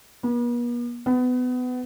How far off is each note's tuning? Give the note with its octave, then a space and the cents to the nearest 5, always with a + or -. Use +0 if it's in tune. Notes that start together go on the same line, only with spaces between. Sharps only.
B3 -45
B3 +25